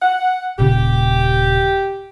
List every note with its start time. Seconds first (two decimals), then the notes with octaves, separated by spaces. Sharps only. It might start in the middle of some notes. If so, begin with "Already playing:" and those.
0.02 F#5
0.59 D#1 A#2 C#3 G4